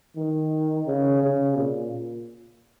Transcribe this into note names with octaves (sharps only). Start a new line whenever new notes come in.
D#3
C#3
C#3
A#2